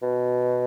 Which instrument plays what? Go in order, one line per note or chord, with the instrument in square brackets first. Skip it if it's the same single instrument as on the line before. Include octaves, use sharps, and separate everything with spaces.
[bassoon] B2